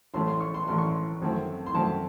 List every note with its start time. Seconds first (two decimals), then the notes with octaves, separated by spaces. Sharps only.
0.14 A1 A2 F#3 A3 C#4 C6
0.28 C6
0.41 C#6
0.54 C6
0.68 A1 A2 F#3 A3 C#4 C6
0.78 C#6
0.89 C6
1.22 G#1 F#2 D#3 A3 C4
1.66 C6
1.74 G#1 F#2 D#3 A3 C4 A5